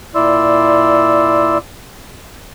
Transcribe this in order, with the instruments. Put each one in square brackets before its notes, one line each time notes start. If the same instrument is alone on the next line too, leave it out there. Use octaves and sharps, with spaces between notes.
[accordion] A#2 E4 D5 C6 E6